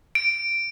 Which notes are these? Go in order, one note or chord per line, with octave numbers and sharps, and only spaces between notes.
D7